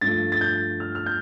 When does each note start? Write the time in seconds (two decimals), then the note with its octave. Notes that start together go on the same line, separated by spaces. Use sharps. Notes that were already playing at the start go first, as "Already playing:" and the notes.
0.01 G2 F3 A3 A6
0.32 A6
0.41 G6
0.80 F6
0.95 F6
1.06 G6